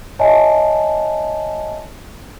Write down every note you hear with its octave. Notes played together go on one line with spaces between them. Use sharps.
C#5 D#5 E5 G#5 A5